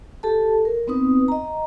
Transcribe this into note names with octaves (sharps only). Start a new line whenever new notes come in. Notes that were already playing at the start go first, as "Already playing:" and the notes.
G4 A4 A5
A#4
B3 C4 D#4 B4 D#6
D#5 A#5